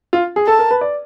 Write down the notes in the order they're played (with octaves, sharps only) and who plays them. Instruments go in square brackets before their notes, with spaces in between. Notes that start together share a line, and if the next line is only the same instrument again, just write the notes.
[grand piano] F4
G#4
[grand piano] A4 [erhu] A5
[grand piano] A#4
B4
D5